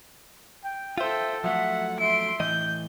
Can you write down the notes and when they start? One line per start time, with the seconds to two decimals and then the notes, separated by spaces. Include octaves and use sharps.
0.64 G5
0.98 F4 A4 C5 E5 G5
1.44 F3 F#3 A3 E5 F#5
2.00 E5 C6 D7
2.40 A2 E3 D#5 G6